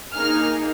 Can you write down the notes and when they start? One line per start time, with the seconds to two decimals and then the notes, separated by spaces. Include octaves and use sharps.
0.14 A#3 D#4 G#4 F6